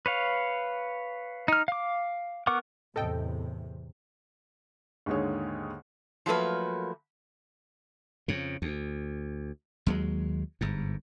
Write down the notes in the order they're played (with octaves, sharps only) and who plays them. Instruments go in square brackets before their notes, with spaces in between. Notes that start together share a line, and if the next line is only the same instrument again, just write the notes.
[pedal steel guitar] B4 C#5 F5
D#4 F6
F5 D6
B3 A#4 F#5 C#6 D6
[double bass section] E2 A2 C3 [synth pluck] A4 D#5 G5
[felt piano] D#2 G#2 D3 G#4 C#5
[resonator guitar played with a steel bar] F3 F#3 A3 A#3 B4
[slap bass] F2 C#3
D2
D#2 F#3 G#3
G1 G#2